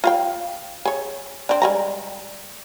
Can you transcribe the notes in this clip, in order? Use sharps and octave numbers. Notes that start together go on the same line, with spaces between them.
F4 F5 G5
G#4 C#5
C4 D4
G3 G#3 A#5